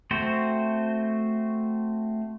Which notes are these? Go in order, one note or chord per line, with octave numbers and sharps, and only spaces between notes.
A3 C4 F#4 C5